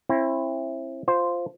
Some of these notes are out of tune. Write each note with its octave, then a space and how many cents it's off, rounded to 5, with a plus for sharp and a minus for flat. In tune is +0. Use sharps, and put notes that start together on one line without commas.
C4 +35 E4 +10
F4 +0 C5 +0